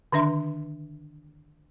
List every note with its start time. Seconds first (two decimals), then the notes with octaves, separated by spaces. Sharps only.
0.12 D3 D#3 D4 E5 C6